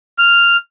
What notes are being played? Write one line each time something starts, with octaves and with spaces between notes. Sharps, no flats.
F6